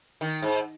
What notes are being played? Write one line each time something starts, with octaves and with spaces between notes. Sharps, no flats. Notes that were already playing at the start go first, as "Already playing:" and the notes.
D#3
G#2